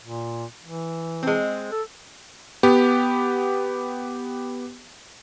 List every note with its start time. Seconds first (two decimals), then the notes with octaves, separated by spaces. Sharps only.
0.03 A#2
0.63 E3
1.23 G#3 C4
1.72 A4
2.63 B3 G4